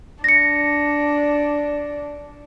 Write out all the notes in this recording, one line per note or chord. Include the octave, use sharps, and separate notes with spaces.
D4 A#6 C#7